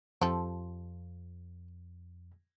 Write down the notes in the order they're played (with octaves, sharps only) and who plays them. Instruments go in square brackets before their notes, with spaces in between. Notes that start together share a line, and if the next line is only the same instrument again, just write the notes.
[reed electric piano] F2 [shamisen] F3 G4 A4